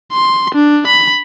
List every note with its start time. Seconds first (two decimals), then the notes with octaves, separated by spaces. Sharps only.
0.13 C6
0.55 D4
0.87 B5